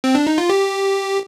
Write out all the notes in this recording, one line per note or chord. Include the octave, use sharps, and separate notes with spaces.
C4
D4
D#4
F4
G4